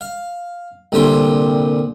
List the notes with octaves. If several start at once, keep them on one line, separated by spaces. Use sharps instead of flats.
F5
C2 A#2 D3 G4 G5 C6